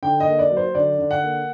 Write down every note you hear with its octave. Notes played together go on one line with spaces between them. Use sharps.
D3 G5
D#5
A#3
D5
F#3
C5
D3 D5
D3
F#5
A#3